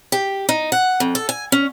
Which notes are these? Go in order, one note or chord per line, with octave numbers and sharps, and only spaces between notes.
G4
D#4
F#5
F2
A4
G#5
C#4